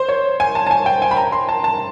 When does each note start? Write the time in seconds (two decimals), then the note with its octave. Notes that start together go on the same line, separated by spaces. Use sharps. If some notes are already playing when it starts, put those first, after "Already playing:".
Already playing: C5
0.09 C#5
0.40 G#5
0.55 A5
0.67 A5
0.71 G#5
0.86 G5
1.02 G#5
1.11 B5
1.17 A#5
1.32 C6
1.49 A5
1.64 A5